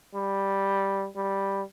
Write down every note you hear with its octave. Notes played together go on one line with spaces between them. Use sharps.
G3
G3